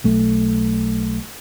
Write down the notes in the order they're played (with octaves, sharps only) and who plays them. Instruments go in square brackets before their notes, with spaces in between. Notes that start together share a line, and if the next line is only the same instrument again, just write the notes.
[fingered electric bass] B1 A3